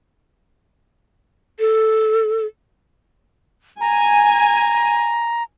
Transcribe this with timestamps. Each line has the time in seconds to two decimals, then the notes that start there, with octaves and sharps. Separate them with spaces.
1.59 A4
3.81 G#5 A#5